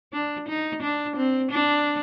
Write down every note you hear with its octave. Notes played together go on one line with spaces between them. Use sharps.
D4
D#4
D4
C4
D4